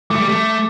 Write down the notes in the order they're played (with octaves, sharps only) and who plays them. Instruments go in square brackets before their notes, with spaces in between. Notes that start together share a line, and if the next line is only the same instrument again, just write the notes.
[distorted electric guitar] A3 [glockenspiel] D6
[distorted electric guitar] G3
A3